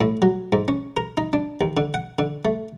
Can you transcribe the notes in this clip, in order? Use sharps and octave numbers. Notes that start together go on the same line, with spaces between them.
A2
F#3
G#2
C#4
A#4
D#4
D4
D#2
D3
F#5
D3
A3